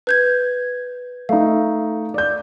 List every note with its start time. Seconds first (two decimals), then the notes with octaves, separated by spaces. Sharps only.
0.07 B4 G6 G#6
1.29 A3 D#4 F5
2.14 D5 G6